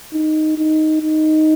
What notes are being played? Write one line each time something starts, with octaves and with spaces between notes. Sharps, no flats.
D#4
D#4
D#4